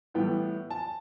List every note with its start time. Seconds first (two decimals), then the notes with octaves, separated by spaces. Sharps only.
0.14 A2 E3 G3 B3 G5
0.71 A5